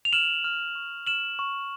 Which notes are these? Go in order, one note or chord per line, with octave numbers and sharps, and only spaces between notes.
F7
F6 E7 F#7
F6
C#6
F6 E7 F#7
C#6